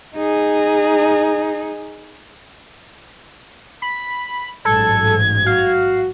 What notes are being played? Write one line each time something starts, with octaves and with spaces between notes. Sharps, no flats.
D#4 G#4
B5
A1 G#2 F#3 A4 G#6
F#4 F5